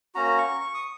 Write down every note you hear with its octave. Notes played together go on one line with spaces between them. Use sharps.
A#3 C#4 F#4 A#5
C#6
C#6
D#6